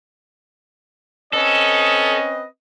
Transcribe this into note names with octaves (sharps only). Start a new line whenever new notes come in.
C4 C#4 A4 B4 D#5